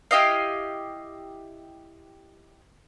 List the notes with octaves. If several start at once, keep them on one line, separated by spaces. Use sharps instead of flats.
E4 G4 D#5 F5